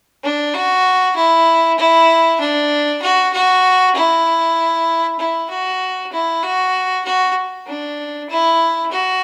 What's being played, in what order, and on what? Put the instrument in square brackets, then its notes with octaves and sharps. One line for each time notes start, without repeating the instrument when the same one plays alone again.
[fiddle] D4
F#4
E4
E4
D4
F#4
F#4
E4
E4
F#4
E4
F#4
F#4
D4
E4
F#4